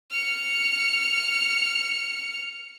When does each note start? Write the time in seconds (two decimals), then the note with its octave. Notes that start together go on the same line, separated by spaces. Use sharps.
0.10 F6 C#7